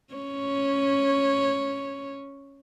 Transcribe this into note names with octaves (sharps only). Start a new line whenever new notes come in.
C#4 C#5